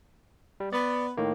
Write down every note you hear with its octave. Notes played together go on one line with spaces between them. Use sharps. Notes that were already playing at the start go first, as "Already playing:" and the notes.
G3
B3 D5
A2 D#3 A#3